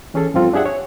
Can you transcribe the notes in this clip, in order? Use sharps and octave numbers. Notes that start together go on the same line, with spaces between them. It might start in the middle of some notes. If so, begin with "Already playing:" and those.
E3 C#4 G#4 A4
G2 F3 C4 F4 A4
D4 G4 G#4 E5 F#5
C#5